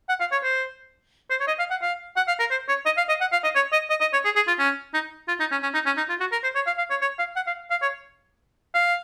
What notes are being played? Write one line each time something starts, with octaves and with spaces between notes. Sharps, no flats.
F#5
F5
C#5
C5
C5
C#5
D#5
F5
F#5
F5
F#5
F5
A#4
C5
C#5
D#5
F5
D#5
F#5
F5
D#5
C#5
D#5
D#5
D#5
C#5
G#4
G#4
F4
C#4
D#4
F4
D#4
C#4
C#4
D#4
C#4
D#4
F4
F#4
A#4
C5
C#5
F5
F5
C#5
C#5
F5
F#5
F5
F5
C#5
F5